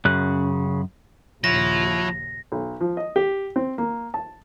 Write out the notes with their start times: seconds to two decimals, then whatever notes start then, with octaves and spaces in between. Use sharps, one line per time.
0.05 F#2 C#3 F#6
1.44 A#1 D#2 C#3 F3 E4 C#5 F#5 A#6
2.52 B1
2.81 F3
2.97 D#5
3.16 G4
3.56 C4
3.78 A#3
4.14 A5